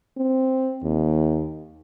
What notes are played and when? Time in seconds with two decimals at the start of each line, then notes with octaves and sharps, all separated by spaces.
0.17 C4
0.83 D#2